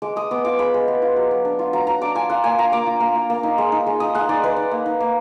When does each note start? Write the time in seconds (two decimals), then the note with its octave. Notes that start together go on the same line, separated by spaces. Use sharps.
0.02 G#3 D6
0.16 G#3 D#6
0.31 B3 D6
0.45 F4 D6
0.59 G#3 B5
0.74 G#3
0.88 B3
1.02 F4
1.16 F#3
1.31 F#3
1.45 D4
1.59 F4
1.73 F#3 A#5
1.87 F#3 A#5
2.01 D4 D6
2.15 F4 G#5
2.30 F4 F#5
2.44 A#3 G#5
2.59 F4 A#5
2.72 A#3 D6
2.87 F4
3.00 A#3
3.15 F4
3.30 A#3
3.43 D#4
3.58 G#3
3.72 D#4
3.86 G#3
4.00 D#4 D#6
4.14 G#3 F#5
4.29 D#4 D5
4.44 G#3 B4
4.57 D#4
4.71 A#3
4.86 D#4
5.00 A#3